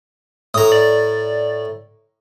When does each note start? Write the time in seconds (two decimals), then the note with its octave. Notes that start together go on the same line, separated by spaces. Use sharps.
0.54 A2 A#5 D#6
0.72 D5